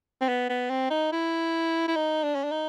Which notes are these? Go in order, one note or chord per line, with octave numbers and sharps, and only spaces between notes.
C4
B3
B3
C4
D#4
E4
E4
D#4
D4
C#4
D4
D#4